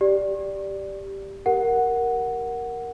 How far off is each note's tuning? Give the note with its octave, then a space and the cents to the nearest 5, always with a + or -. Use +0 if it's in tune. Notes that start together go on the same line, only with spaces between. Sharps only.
G4 +0 D5 +0
G4 +0 A#4 +0 F#5 +0